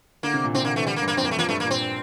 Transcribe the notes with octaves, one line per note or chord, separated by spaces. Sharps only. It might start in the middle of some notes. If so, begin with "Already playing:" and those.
D3 A#3
C3
A#2
C3 C4
D3 A#3
E3 A3
D3 G3
A#3
G2
A#3
F2 C4
A#3
G2 A3
F3 A#3
G2 A3
A#3
A#2
C4